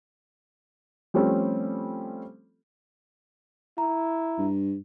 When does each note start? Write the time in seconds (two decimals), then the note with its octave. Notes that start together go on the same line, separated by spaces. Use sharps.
1.14 F3 G3 A3 C4 C#4 A4
3.78 E4 A#5
4.38 G2